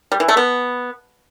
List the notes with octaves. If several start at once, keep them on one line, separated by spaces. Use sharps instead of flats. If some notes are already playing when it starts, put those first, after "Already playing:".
G3
E3
A3
B3